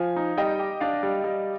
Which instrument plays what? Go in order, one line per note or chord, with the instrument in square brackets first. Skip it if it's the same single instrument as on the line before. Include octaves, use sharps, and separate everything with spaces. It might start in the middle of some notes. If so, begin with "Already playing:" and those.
Already playing: [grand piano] F3 [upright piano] F5 G#5
[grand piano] D#4
[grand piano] G3 [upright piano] D#5 G5
[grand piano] G4
[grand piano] D4 [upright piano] D5 F5
[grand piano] G3
G3